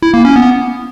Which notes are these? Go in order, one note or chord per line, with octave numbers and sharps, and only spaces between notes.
E4
A#3
C#4
B3